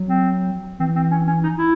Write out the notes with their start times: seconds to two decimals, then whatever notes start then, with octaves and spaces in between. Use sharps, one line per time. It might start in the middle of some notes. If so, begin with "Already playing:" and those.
Already playing: F#3
0.08 C4
0.80 E3 C4
0.96 C4
1.11 C#4
1.27 C#4
1.43 D#4
1.58 E4